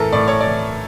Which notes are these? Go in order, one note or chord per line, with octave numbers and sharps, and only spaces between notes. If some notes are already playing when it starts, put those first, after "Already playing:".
Already playing: A2 E3 A4 A#4
A2 D5
C#5
D5
E3